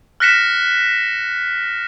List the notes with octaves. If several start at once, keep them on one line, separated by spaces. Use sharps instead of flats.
F6 F#6 A#6 B6 C#7 E7